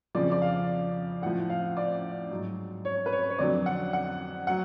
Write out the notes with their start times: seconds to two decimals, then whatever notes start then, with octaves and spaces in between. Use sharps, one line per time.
0.15 F2 C#3 F3 D5
0.32 D5
0.42 F5
1.22 A2 F#5
1.26 F3
1.50 F5
1.77 D5
2.30 G#2 F#3
2.85 C#5
3.06 B4
3.12 C#5
3.30 C#5
3.39 F2 D3 F#3 D5
3.66 F#5
3.93 F#5
4.47 F#3 F#5